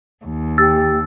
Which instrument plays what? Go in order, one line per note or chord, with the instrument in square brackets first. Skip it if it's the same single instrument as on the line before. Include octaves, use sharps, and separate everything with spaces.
[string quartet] D#2
[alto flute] G4 [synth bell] E6 A6